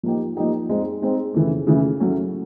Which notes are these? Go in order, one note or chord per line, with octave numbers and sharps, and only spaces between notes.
F3 A#3 D#4 G4
F3 A#3 D#4 G4
G#3 C4 D#4
G#3 C4 D#4
C#3 E3 A3
C#3 E3 A3
F#3 A3 C#4